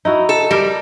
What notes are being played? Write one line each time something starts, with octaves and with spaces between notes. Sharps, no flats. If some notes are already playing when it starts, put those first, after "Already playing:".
D#4 E4 F#4
A4
G3 A#4